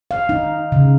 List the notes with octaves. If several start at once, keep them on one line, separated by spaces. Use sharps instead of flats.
F5
D#4
C#3